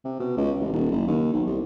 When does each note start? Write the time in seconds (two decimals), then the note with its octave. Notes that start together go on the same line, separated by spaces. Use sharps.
0.05 C3
0.19 B2
0.37 C#2
0.59 A1
0.73 D#1
0.91 F#1
1.07 D#2
1.33 B1
1.47 C2